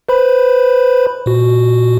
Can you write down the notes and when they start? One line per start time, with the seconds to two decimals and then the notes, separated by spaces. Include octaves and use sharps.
0.09 B4 C5 B5
1.26 A#2 F#4